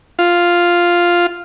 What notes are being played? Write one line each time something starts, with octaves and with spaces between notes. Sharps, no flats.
F4